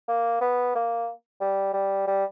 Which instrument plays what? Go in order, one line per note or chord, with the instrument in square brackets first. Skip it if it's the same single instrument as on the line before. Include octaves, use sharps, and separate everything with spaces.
[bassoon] A#3
B3
A#3
G3
G3
G3